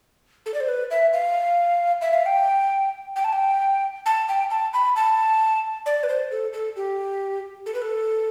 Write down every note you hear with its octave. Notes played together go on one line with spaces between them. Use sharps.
A4
D5
C5
B4
E5
F5
E5
F5
G5
G5
A5
G5
A5
G5
A5
B5
A5
D5
B4
C5
A4
A4
G4
A4
B4
A4